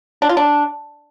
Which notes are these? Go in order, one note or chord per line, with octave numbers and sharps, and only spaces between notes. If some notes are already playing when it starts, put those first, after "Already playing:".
D4
F4
D4